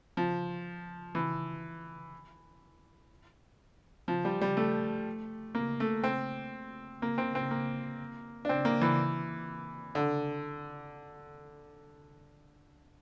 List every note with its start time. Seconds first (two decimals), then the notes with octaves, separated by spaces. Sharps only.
0.17 F3
1.15 E3
4.08 F3
4.25 G3
4.41 G3
4.57 A3
5.55 A#3
5.80 A3
6.04 C4
7.02 A#3
7.18 C4
7.35 C4
7.51 A#3
8.45 D4
8.49 C4
8.65 A#3
8.81 E3
9.95 D3